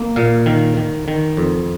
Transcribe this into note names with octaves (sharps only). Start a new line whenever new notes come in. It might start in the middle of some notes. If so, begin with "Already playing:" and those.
Already playing: A#3
A#2 F5
D#3 F5
D#3
D#3
F2